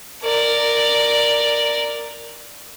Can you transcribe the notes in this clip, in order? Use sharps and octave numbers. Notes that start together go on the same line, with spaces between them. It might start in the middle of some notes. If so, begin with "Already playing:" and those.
A#4 D5